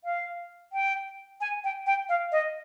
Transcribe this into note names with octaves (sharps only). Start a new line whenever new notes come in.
F5
G5
G#5
G5
G5
F5
D#5